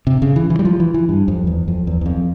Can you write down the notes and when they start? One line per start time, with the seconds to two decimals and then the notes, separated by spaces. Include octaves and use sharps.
0.07 C3
0.22 C#3
0.36 E3
0.50 E3
0.59 G3
0.65 F3
0.80 E3
0.94 E3
1.09 G2
1.28 F2
1.47 E2
1.68 F2
1.87 E2
2.01 E2
2.06 F2